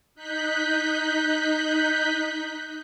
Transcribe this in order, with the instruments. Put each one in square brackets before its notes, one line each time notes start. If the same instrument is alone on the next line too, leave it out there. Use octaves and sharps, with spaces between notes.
[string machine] D#4 F#6 G6 B6